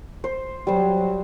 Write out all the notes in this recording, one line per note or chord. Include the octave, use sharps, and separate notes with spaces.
C5
F#3 G3 C5